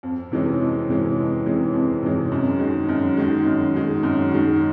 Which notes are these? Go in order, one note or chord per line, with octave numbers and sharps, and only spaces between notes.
F2
C3 E3 G#3 C#4
F2
C3 E3 G#3 C#4
F2
C3 E3 G#3 C#4
F2
C3 E3 G#3 C#4
F#2
D#3 G#3
F#2
D#3 G#3
F#2
D#3 G#3
F#2
D#3 G#3